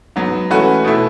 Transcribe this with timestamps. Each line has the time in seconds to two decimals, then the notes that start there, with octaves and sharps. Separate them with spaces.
0.16 G#2 F#3 B3
0.50 E3 A3 C#4 F#4 B4
0.84 B2 A3 E4